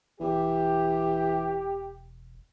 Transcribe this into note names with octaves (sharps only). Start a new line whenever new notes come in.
E1 E3 G4